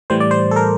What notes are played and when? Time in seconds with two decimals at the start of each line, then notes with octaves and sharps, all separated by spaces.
0.10 A2 E3 G3 C5
0.20 D5
0.31 C5
0.51 A4
0.56 A#4